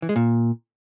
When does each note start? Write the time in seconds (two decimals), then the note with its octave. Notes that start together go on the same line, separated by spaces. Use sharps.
0.02 E3
0.09 G#3
0.16 A#2